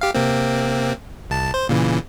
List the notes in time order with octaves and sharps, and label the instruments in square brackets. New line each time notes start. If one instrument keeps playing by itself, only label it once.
[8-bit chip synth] G4 F5
C3 A#3 C4
C2 A5
C5
A#2 C#3 E3